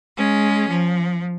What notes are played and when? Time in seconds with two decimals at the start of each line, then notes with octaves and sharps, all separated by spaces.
0.17 G#3 C#4
0.69 F3